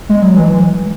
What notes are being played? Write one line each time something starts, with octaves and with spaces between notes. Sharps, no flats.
G#3
F#3
E3